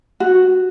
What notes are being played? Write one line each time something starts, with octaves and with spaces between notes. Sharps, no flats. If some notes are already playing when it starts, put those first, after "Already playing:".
F#4